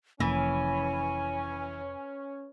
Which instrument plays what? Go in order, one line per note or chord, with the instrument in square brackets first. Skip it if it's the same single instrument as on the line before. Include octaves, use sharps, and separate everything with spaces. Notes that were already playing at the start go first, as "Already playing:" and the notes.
[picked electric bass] F1 F2 A#3 [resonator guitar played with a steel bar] E3 [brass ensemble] C#4 [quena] G#5